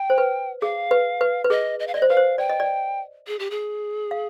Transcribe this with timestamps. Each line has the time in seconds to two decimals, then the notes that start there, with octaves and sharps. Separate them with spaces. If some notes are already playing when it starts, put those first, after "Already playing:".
Already playing: G5
0.10 C5
0.18 B4
0.62 G#4 F5
0.91 B4
1.21 B4
1.44 B4
1.50 G#4 D#5
1.80 D#5
1.87 F5
1.94 D5 D#5
2.02 C5
2.09 B4 F5
2.17 C5
2.38 D5 G5
2.49 D#5
2.60 D5
3.27 G#4
3.39 G4
3.50 G#4
4.11 F5